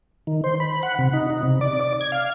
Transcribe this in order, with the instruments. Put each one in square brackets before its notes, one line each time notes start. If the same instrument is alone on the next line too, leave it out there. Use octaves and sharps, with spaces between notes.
[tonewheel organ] D#3
C5
B5
F#5
C3
D#4
D#4
C3
D5
D5
G#6
F5